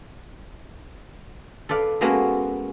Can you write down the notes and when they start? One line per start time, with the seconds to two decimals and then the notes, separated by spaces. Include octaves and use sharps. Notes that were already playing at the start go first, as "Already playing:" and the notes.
1.69 A4 B4 D5 F5
2.01 G#3 A#3 B3 C#4 F#4 A4